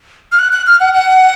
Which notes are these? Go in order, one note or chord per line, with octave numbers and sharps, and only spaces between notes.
F6
F#6
F#6
F6
F#5
F#5